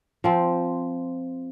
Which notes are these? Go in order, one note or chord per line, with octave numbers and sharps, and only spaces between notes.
F3 C4